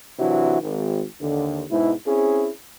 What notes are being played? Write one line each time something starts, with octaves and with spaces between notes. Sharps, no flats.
C3 E3 F#3 D4 E4 F#4
G#1
D#2 D3
G#2 B2 E4
C4 C#4 E4 G#4